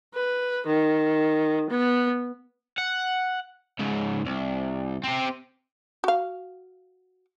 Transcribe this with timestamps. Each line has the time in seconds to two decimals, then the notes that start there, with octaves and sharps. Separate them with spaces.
0.14 B4
0.66 D#3
1.70 B3
2.78 F#5
3.79 G#2 C#3
4.25 C2
5.04 C4 G4
6.04 F#4 F5